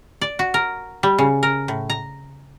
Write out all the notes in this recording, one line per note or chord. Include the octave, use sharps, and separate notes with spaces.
D5
F#4
A#4
G3
C#3
A#4
A2
A#5